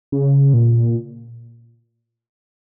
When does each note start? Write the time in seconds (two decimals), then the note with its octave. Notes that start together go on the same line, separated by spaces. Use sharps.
0.12 C#3
0.54 A#2